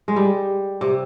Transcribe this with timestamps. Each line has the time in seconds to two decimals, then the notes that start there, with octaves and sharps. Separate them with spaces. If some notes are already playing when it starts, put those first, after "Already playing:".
0.08 G#3
0.16 G3
0.81 C3